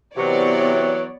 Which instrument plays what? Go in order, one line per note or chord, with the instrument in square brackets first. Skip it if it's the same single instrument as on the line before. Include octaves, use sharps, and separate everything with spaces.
[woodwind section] C3 [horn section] E3 F#3 [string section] B3 C#5 D5